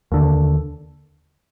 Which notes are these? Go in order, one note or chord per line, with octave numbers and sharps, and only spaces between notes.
D#2 D3